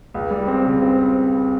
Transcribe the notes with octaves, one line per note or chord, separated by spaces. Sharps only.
C#2
G3
C4
C#3
C4
C4